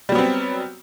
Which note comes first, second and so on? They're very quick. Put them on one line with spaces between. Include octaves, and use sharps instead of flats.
G3 F#3 B3 C4